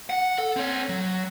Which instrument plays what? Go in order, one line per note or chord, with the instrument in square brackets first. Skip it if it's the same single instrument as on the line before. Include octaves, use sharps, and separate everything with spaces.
[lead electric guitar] F#5
A4
C4 C#5
F#3